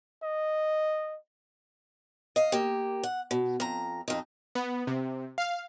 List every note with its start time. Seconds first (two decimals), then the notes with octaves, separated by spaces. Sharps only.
0.23 D#5
2.36 D#5 F5
2.52 A#3 G4
3.03 F#5
3.31 B2
3.60 F2 A#5
4.08 F2 D#4
4.55 B3
4.87 C3
5.38 F5